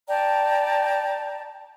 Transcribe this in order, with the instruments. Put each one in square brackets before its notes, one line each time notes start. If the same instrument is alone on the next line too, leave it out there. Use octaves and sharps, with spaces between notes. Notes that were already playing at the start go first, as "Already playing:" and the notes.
[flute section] D5 G5 A5 A#5